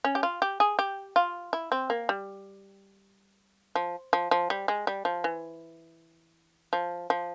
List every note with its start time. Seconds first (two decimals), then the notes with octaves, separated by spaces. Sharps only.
0.04 C#4
0.15 G4
0.23 F4
0.42 G4
0.60 G#4
0.79 G4
1.16 F4
1.53 E4
1.72 C4
1.90 A#3
2.09 G3
3.75 F3
4.13 F3
4.31 F3
4.50 G3
4.68 G#3
4.87 G3
5.05 F3
5.24 E3
6.73 F3
7.10 F3